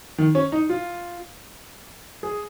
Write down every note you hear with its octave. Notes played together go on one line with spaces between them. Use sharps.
D#3
C#4
D#4
F4
G#4